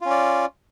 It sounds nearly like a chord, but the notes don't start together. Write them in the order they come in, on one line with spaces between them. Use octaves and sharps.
F4 C#4 D5